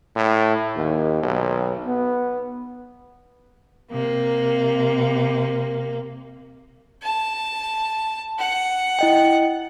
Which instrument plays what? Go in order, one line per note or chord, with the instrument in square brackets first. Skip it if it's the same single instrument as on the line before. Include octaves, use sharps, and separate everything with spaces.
[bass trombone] A2
D#2
B1
B3
[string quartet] C3 A#3
[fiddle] A5
F#5
[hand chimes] E4 D#5 G5